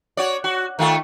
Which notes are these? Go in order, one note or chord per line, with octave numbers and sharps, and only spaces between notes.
F#4 C#5 D5
F#4
D#3 A3 F4